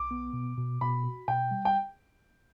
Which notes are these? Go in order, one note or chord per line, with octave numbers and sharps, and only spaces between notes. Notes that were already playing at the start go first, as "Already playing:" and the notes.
Already playing: B1 D6
B3
B2
B2
B2 B5
F#4
B2 G5
G3
G5